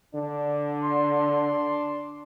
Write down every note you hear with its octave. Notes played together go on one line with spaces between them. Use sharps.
D3 D4
C6